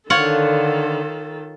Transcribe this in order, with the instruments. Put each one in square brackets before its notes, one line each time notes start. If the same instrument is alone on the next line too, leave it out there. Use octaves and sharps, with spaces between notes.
[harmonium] D3 [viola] D#3 A4 [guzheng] F4 C#5 F#5